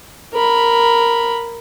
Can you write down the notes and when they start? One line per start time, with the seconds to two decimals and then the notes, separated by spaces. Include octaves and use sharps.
0.34 A#4 B5